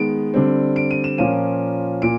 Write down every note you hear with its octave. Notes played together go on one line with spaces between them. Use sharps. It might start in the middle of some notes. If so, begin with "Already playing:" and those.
Already playing: D#3 G#3 B3 D7
D3 G3 C4
D7
D#7
E7
A#2 F3 A#3 C#4 D#7
A#2 D7